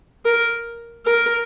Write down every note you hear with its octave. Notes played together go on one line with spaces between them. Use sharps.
A#4
A#4